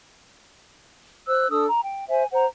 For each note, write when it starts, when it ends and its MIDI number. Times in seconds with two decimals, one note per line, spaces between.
1.27 1.49 72
1.27 1.49 88
1.27 1.49 90
1.49 1.65 62
1.49 1.65 69
1.49 1.65 87
1.49 1.65 88
1.67 1.82 82
1.84 2.08 79
2.09 2.24 72
2.09 2.24 76
2.09 2.24 80
2.32 2.45 72
2.32 2.45 78
2.32 2.45 82